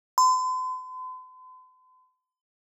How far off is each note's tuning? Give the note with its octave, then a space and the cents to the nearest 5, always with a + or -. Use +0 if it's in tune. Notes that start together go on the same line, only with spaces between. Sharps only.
C6 -45